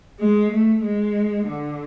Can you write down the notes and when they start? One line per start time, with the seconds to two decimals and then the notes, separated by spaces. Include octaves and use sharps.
0.20 G#3
0.52 A3
0.83 G#3
1.47 D3